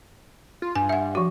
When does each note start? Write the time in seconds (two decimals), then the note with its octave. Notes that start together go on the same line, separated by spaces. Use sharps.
0.62 F4
0.75 G2 G#5
0.89 E5 F#5
1.15 F3 F#4